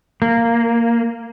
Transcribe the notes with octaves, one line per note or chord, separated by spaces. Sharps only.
A#3